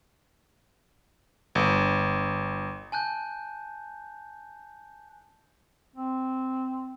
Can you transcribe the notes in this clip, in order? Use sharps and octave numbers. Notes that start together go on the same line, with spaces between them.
G1
G#5 A5 F#6 G6
C4